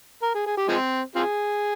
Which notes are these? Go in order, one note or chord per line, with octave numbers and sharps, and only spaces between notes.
A#4
G#4
G#4
G4
F3 G#3 C4
C4 F4 G#4